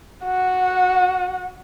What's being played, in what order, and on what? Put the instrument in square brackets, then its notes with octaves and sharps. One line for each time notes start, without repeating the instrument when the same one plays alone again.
[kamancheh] F#4 F#5